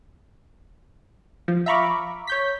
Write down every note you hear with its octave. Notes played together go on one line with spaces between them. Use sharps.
F3
E5 F5 A#5 B5 C#6 D6
C#5 G6 B6